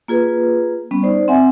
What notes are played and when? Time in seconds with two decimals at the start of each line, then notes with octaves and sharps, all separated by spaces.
0.08 A#3 F4 G#4 B4
0.91 G3 B3 C#4
1.03 D#4 C5 D5
1.28 C4 E5 F#5 G#5